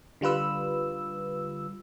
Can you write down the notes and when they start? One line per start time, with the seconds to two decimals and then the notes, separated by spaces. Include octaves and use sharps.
0.21 D3 G3 F4 B4 E6